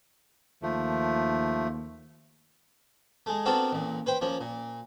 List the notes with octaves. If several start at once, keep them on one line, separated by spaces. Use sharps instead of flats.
D#2 F3 A3
G#3 A3
B3 C4 D4 F#4 A4 A#4
A1 A#2
B4 C5 G5
F3 A#3 C#4
A#2